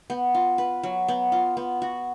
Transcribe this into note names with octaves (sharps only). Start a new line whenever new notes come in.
B3
F4
B4
F#3
B3
F4
B3
F#4